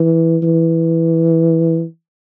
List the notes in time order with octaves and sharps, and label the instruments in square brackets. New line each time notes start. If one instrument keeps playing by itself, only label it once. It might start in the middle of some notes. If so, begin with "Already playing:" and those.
Already playing: [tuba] E3
E3